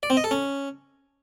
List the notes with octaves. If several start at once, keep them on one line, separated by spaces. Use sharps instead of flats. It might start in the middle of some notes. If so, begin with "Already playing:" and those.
D5
C4
D#5
A4
C#4